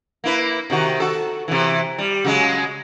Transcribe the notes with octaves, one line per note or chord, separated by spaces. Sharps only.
A#3 E4 B4
C3 D#3 F#4
F#4 A4
C3 E3
G3
C#3 F#3 G#3